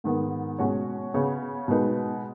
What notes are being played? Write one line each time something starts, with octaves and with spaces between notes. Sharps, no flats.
G#2 D#3 G#3 B3
B2 G#3 C#4 F#4 C#5
C#3 B3 G#4 C#5
B2 G#3 D#4 B4